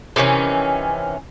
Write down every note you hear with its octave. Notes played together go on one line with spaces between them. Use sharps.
C3 D#3 E3 C#4